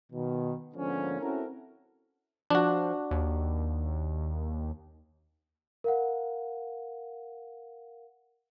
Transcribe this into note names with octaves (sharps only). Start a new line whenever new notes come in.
B2 D#3
G#2 D3 F3 A#3 B3 C#4
C4 C#4 E4 F#4 A4 A#4
F3 D4 F#4
D#2
A#4 F5 F#5